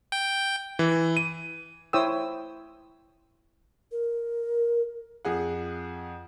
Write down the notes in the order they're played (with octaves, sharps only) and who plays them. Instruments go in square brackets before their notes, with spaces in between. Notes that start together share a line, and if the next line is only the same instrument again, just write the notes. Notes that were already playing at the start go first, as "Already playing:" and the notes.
[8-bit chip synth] G5
[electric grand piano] E3
D#7
[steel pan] E4 C5 C#5 G5 D#6 E6
[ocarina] A#4
[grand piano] F2 G#4 F#5